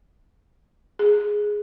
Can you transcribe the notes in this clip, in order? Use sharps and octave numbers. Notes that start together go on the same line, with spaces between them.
G#4